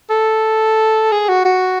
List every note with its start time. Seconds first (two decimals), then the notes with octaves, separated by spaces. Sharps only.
0.10 A4
1.12 G#4
1.29 F#4
1.45 F#4